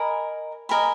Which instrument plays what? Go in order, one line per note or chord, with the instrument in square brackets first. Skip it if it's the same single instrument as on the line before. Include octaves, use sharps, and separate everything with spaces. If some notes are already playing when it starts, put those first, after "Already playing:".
Already playing: [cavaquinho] A#4 D#5 G#5 B5
A#4 D#5 G#5 B5